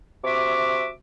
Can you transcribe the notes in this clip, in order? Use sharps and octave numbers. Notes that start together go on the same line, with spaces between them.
C3 F#4 E5 D6